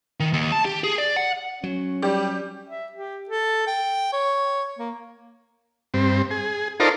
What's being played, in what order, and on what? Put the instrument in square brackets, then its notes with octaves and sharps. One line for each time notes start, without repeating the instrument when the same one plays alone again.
[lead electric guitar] D#3
D#2
A5
G4
G#4
D5
F#5
[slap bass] F#3 [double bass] C#4
[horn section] G3 [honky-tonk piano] G4
[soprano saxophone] E5
G4
A4
G5
C#5
A#3
[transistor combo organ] G2 C4
G#4
D#4 F4 A4 A#4 C5 D5